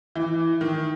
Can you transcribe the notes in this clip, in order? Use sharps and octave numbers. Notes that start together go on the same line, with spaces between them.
E3
D#3